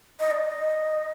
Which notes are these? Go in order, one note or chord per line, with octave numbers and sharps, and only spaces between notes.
D#5
D5
D#5